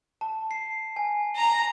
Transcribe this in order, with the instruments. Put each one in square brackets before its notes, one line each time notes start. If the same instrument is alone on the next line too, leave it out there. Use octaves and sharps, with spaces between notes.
[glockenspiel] A5
C7
G#5
[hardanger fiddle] A#5